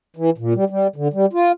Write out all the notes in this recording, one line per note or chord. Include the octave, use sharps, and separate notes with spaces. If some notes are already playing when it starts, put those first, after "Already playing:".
E3
A#2
G3
G3
D3
G3
F4